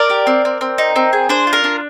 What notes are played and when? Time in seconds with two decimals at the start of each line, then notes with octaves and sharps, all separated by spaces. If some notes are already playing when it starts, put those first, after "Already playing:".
Already playing: A#4 D5
0.10 G4
0.27 C4
0.45 C4
0.61 C4
0.78 D#4
0.96 C4
1.13 G#4
1.29 D4 C5
1.47 F4
1.53 A#4
1.64 D4